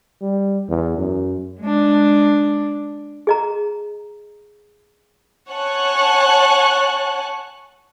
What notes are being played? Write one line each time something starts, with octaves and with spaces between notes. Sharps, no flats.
G3
E2
F#2
G#3 D4
G#4 D#5 A#5
C#5 F#5 G#5 A5 C#6 F#6